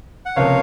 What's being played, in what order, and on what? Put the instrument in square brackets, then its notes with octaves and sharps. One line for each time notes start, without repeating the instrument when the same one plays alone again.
[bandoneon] F#5
[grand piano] C#2 C3 F3 A#3 [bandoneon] C#5 F5